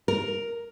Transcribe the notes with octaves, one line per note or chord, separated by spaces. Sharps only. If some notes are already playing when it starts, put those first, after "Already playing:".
A#4